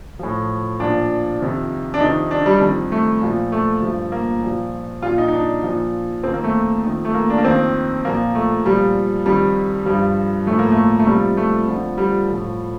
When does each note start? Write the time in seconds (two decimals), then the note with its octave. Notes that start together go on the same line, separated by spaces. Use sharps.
0.19 A2 F3
0.80 A#2 F3 D4
1.40 F2 C3 D#3
1.94 D4
2.00 F2 C3 D#3 D#4
2.31 D4
2.46 G3
2.61 F2 D#3
2.92 A3
3.22 A#2 F3
3.52 A3
3.82 G2 F3
4.12 A#3
4.42 A#2 F3
5.02 A#2 F3 F4
5.18 D#4
5.28 D#4
5.33 D4
5.63 A#2 F3
6.23 F2 C4
6.26 D#3
6.34 A#3
6.44 A3
6.84 F2 D#3
7.05 A3
7.14 A#3
7.30 D4
7.38 A#3
7.44 F2 D#3 C4
8.05 A#2 F3 A#3
8.35 A3
8.65 A#2 F3 G3
9.26 F2 D#3 G3
9.86 G2 F3 G3
10.46 A2 F3 A3
10.59 A#3
10.72 A3
10.99 A3
11.07 F2 C3 F3 G3
11.37 A3
11.67 F2 D3 F3
11.98 G3
12.28 A2 F3